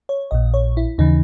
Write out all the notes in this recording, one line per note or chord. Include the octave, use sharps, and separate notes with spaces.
C#5
A#1 A#2 D#5
C#5
E4
D#2 C#3 E3 D#4